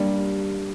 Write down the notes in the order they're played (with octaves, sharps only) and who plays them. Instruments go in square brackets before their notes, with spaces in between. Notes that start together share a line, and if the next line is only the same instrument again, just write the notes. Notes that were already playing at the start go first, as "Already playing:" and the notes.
Already playing: [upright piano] G3 A#3 D4 G4